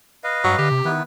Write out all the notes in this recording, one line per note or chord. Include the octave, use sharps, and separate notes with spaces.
B4 D#5 F5
G2 F#3
D3 G4
C3
D#3 B3 E4 B4